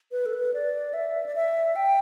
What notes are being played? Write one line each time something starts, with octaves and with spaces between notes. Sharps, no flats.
B4
A4
B4
D5
E5
D5
E5
G5